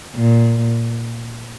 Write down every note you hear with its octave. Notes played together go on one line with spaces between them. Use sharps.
A#2